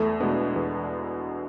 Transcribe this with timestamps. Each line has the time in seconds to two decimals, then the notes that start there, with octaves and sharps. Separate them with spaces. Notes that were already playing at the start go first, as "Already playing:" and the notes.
Already playing: E2 A3
0.20 B2 G#3 B3 D4
0.56 E2